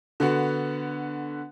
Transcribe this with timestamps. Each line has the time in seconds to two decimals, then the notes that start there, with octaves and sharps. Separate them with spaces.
0.20 D3 B3 F#4